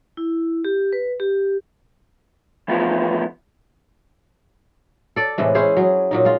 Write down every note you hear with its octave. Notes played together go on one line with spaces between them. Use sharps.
E4
G4
B4
G4
E3 F3 A3 B3 E4 F4
A4 D5
A2 C3 E3 G#3
C#4 E4 G#4 C5
F#3 G#4
A#2 F#3 D#4
G#3 F4